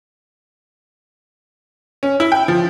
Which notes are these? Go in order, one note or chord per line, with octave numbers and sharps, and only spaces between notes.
C#4
E4
G5
F3